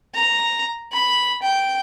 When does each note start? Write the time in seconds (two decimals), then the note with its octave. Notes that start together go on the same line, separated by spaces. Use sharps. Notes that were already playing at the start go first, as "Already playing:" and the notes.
0.14 A#5
0.92 B5
1.42 G5